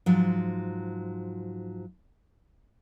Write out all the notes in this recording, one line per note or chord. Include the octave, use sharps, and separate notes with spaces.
G#2 F3 F#3